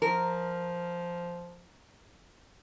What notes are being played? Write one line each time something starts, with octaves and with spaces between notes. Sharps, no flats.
F3 A#4